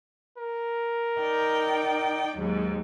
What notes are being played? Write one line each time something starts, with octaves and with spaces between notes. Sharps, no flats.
A#4
D#4 D5 G5
D#2 G#2 F#3